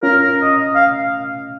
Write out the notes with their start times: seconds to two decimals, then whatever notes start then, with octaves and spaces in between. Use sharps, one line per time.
0.03 C#4 F4 A#4
0.22 A#4
0.42 D#5
0.75 F5